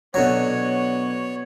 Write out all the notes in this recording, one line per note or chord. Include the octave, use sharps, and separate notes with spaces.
B2 D3 F#3 B3 F#4 C#5